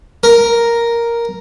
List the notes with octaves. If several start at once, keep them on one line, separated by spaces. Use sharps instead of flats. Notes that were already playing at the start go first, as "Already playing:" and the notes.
A#4